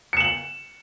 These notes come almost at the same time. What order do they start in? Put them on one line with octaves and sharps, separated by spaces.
C#7 E7 F#7